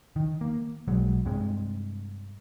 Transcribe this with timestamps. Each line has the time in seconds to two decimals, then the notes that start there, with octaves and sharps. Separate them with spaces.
0.16 D#3
0.41 A#3
0.88 B1 F#3 G#3
1.25 G2 C3 G#3